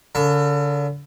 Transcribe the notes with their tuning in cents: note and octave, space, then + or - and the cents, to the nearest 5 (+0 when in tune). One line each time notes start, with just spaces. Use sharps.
D3 -40 A4 +35